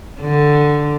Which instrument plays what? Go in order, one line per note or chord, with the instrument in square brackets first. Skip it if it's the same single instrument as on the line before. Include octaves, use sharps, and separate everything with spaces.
[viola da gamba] D3